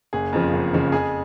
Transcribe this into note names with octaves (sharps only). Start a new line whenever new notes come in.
F#1 G#4
F2 C#3 F3
F#1
F2 C#3 F3
F2 G#4